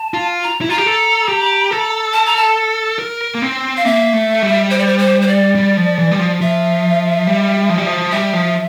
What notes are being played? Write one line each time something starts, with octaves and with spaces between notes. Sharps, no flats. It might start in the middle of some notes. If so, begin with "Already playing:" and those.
Already playing: A5
F4
A#5
E4
F4 A#5
G4
A4
G4
A4
A5
A#5
A5
A#4
A#3
C4
F5
A#3 E5
A3
G3
C5
D5
C5
C5
C5
D5
G3
F3
E3
G3
F3
F3 E5
G3
F3
G3
F3
G3 E5
F3